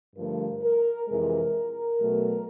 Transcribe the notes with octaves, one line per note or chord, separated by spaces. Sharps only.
G2 D3 F3 A3 A#4
A#4
F2 C3 E3 G#3 A#4
B2 F#3 A3